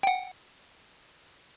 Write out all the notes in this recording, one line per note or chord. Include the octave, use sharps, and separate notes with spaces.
F#5 G5